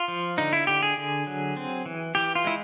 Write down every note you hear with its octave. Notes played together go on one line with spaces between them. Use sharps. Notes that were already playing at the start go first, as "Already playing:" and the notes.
Already playing: F4
F3
D3 D#4
E4
D3 G4
G#4
D3
F#3
C4
E3
E3 G4
F4
G#3 E4